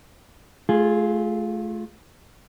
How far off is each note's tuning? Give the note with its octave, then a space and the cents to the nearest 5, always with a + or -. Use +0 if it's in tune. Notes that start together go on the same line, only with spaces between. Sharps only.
A3 -30 F4 +0 G#4 +0